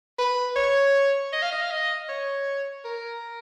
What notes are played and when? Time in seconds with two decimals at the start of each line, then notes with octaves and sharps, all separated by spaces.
0.19 B4
0.56 C#5
1.33 D#5
1.42 F5
1.52 D#5
1.62 F5
1.71 D#5
2.09 C#5
2.85 A#4